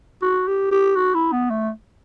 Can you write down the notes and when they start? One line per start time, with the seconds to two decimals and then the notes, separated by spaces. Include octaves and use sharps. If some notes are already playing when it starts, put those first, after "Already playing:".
0.22 F#4
0.47 G4
0.71 G4
0.96 F#4
1.14 E4
1.32 B3
1.50 A3